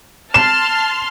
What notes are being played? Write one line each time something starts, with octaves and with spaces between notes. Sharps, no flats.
A5 C6 F6 E7